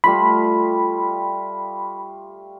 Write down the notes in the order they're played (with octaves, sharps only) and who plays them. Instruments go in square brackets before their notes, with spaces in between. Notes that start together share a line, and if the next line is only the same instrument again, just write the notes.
[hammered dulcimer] G3 A3 F4 [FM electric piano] B5